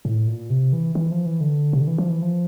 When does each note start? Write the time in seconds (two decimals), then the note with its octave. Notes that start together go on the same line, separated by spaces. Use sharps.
0.05 A2
0.27 A#2
0.50 C3
0.73 E3
0.95 E3
1.11 F3
1.26 E3
1.41 D3
1.73 C3
1.80 D3
1.87 E3
1.98 F3
2.10 E3
2.22 F3